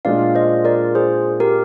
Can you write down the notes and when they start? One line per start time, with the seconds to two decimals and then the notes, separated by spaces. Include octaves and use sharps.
0.05 A#2 G#3 D4 F4 D5 F5
0.35 C5 D#5
0.65 A#4 D5
0.95 G#4 C5
1.40 G4 A#4